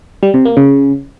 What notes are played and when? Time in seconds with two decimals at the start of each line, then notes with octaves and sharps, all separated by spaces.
0.23 G3
0.34 C3
0.45 A#3
0.57 C#3